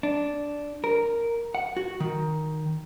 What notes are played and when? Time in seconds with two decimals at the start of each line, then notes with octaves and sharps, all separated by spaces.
0.03 D4
0.84 A#4
1.55 F#5
1.77 F#4
2.00 D#3